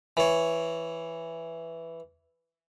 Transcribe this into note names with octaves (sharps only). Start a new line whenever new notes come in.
E3 C#5